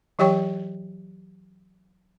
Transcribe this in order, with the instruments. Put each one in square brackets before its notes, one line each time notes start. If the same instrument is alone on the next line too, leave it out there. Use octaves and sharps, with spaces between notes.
[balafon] E3 F#3 G4 C#5 G5 C#6